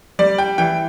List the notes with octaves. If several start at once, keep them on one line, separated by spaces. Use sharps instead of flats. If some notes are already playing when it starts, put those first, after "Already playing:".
G3 D5
G5
E3 G5